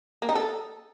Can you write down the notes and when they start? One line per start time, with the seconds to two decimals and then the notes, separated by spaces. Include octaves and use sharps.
0.22 A#3
0.29 D#4
0.35 A4